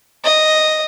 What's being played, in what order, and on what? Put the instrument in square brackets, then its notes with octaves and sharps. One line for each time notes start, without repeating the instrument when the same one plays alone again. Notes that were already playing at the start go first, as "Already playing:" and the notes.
[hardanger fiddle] D#5